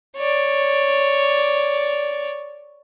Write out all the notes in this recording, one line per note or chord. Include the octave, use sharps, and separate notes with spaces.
C#5 D5